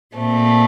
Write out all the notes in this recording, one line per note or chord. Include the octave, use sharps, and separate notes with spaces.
A#2 A3 C4